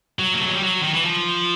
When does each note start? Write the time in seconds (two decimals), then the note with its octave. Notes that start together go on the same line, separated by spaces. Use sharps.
0.19 F#3
0.34 A#3
0.41 A3
0.48 G#3
0.54 G3
0.62 F#3
0.83 D#3
0.94 E3
1.05 F3